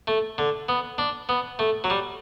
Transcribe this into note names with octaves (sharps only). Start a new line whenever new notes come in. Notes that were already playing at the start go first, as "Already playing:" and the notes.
A3
D3
B3
D4
B3
A3
F#3
G3